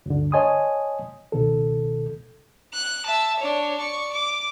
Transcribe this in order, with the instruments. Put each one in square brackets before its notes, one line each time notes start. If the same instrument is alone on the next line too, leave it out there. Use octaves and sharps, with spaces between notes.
[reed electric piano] D2 G2 D3
C#5 D#5 G#5 A5 C6 D#6
C#2 B2 D#3 A4
[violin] F#6
E5 A5
D4 C#5
D5 C#6
D6